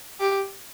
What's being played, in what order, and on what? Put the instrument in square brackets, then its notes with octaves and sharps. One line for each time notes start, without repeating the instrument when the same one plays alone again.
[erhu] G4